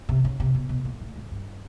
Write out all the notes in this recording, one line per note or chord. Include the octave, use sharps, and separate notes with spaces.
C3
C#3
C3
B2
B2
A#2
A2
G#2
G2